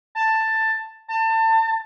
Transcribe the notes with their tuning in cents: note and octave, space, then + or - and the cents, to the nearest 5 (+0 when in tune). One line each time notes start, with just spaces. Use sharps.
A5 +10
A5 +30